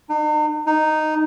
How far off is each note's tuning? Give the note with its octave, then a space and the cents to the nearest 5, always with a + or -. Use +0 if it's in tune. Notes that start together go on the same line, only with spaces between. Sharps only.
D#4 -45
D#4 -5